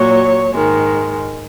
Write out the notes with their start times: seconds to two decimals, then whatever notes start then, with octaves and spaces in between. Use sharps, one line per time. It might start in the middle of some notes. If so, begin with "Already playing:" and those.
Already playing: A#2 F#3 C#5
0.51 G#2 D#3 G#3